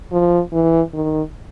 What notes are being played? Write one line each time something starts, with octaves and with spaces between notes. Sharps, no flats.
F3
E3
D#3